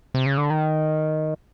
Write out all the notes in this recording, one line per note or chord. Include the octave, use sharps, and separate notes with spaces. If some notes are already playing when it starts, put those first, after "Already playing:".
C3
C#3
D3
D#3